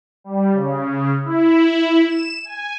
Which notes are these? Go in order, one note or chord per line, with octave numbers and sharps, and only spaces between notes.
G3
C#3
E4
E7
G#5